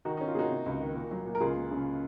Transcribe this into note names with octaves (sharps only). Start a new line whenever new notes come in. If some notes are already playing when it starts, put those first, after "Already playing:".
D#3 D#4 F#4
C#4 D#4
F4
A#3 D#4 F#4 G#4
C3
C#2
D#3
A#2
F#3
A#2
A#4
C#2 F4 G#4
A#3
C#3